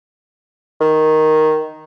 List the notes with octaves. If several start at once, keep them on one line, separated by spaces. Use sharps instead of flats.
D#3